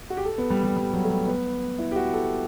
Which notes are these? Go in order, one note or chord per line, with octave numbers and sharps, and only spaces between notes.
F#4
G4
A4
B3
G3
G3
G3
F#3
A3
G3
B3
E4
G4
F#4
A4